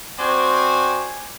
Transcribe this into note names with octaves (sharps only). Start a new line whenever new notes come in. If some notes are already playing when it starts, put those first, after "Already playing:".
C4 F#4 C5 D5 G5 G#5